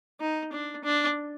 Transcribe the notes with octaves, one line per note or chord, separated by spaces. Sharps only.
D#4
D4
D4